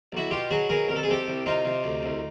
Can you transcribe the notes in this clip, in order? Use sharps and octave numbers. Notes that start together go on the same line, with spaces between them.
B1 E4 F#4
B2 F4 G4
F#3 F#4 G#4
B2 G#4 A#4
C2 A#4
A4
G#4
C3 G4 A4
C2
C3 D#4 F4
C3
D2
C2